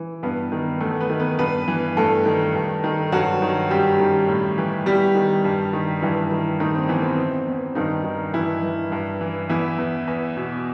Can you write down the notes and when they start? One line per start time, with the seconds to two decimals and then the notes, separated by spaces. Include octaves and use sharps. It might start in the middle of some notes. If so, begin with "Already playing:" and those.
Already playing: E3
0.23 G2 B3 B4
0.52 D#3
0.81 E2 A3 A4
1.00 B3 B4
1.10 D#3
1.20 B3 B4
1.38 G2 B3 B4
1.68 E3
1.97 G2 A3 A4
2.26 D#3
2.55 G2
2.84 D#3
3.12 G2 F#3 F#4
3.42 D#3
3.70 F#2 G3 G4
4.00 D#3
4.28 A2
4.58 E3
4.86 E2 G3 G4
5.15 D#3
5.44 G2
5.73 D#3
6.02 G2 E3 E4
6.31 D#3
6.60 A2 D#3 D#4
6.75 C4
6.89 E3 B3
7.04 C4
7.18 E2
7.47 E2
7.75 G2 D#3 D#4
8.04 D#3
8.34 G2 E3 E4
8.63 E3
8.92 G2
9.21 E3
9.49 E2 E3 E4
9.78 E2
10.08 E2
10.37 B2